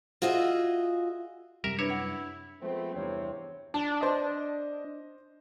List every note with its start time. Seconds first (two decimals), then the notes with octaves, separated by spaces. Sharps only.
0.22 F4 F#4 G#4 D#5 E5
1.64 F#2 C3 G3 A#4 E5
1.79 D4 E4 B4 C#5
1.90 F#5
2.61 F3 G#3 A3 B3 C4
2.93 E2 G2 C3 C4 C#5
3.74 D4 A5
4.01 C5 D#5